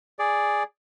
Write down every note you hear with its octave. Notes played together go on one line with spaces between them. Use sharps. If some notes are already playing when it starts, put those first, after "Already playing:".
G#4 D5